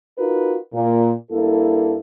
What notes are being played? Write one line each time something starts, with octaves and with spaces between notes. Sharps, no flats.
D#4 F4 F#4 A#4 B4
A#2
G2 A#3 E4 A4